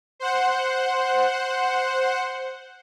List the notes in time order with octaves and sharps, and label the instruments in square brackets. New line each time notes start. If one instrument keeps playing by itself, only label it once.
[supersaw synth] C5 F#5